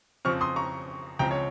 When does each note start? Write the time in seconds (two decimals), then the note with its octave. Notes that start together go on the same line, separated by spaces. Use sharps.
0.25 F2 C#3 F3 C4 C#6 F6
0.41 C6 D#6
0.56 A#5 C#6
1.19 C#2 C#3 F3 C4 G5 A#5
1.31 C#5